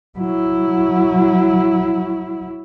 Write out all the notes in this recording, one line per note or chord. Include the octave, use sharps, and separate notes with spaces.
F#3 E4